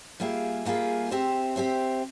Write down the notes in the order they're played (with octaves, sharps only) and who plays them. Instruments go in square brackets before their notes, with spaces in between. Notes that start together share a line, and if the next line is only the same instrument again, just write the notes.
[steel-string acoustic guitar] G3 A#3 F4 G#4 E5
G3 A#3 F4 G#4 E5
C4 G4 C5 E5
C4 G4 C5 E5